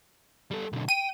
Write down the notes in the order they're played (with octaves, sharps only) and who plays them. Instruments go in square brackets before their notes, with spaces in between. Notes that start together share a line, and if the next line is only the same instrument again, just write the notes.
[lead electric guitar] G3 A4
B1 D3
[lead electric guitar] G5 [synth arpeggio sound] D#7